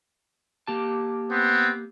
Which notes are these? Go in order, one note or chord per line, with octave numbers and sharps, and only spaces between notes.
A#3 G4 A5
B3 C4